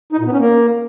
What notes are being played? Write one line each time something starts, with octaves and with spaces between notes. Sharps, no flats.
D#4
A#2
B3
C#4
A#3